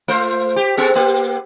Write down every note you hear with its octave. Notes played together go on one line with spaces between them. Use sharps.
A3 F4 C5
G4
B3 G#4 A4
A#3 G4